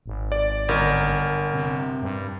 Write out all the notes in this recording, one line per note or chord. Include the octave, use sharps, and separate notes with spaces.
G#1
D5
G1 A#4
C3
G2